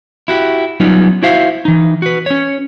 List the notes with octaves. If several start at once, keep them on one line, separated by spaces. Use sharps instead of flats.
E4 F#4 G4
F#3 G3 B3 C#4 D#4 F4
E4 F#4 C5 E5 F5
E3 D#4
F#4 B4
C#4 C#5